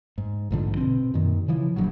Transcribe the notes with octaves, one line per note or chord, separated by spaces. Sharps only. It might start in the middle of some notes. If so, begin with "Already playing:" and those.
G#2
A#1 G#2 D3 F3
B2 C4
F#2 A#2 D#3
C#3 E3 F3
D#1 G2 A#2 F#3